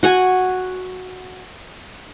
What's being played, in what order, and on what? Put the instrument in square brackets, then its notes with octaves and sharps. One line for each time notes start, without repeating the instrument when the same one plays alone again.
[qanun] F#4 F#5 G#5